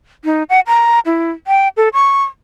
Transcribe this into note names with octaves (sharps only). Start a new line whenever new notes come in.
D#4
F#5
A#5
E4
G5
A4
C#6